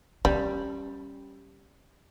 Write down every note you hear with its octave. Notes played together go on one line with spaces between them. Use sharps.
G3 C#4